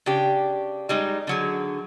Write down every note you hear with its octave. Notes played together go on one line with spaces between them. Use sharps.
C#3 D4 G4
G3 G#3 D#4
D3 F#3 G#4